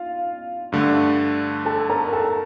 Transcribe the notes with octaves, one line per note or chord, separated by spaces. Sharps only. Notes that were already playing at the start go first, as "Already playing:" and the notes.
Already playing: F4 F5
G2 D3 A3
A4 A5
A#4 A#5
A4 A5